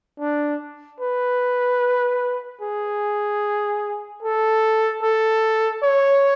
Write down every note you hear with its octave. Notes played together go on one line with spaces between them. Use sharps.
D4
B4
G#4
A4
A4
C#5